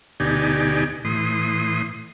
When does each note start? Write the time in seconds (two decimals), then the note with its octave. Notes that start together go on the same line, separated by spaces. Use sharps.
0.20 D2 B2 D#4 G4 D5 G#5
1.05 A2 E3 C6 D#6